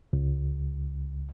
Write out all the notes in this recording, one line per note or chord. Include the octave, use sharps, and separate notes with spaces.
C#2